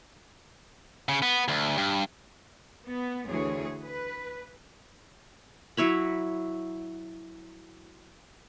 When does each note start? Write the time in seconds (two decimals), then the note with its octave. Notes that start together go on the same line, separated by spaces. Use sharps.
1.09 C#3
1.22 B3
1.48 D2
1.77 G2
2.87 B3
3.27 D2 E3 G#4 C#5
3.83 B4
5.77 F#3 E4 C#5 B5